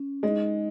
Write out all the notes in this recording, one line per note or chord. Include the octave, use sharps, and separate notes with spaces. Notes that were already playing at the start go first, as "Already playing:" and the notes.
Already playing: C#4
G#3 D#4 G#4 D#5